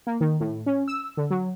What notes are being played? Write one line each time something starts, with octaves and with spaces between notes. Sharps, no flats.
A#3
D#3
A2
C#4
E6
D3
F#3